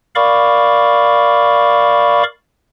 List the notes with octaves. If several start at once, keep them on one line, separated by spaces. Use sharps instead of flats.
A#4 D5 F5 B5 C#6 D6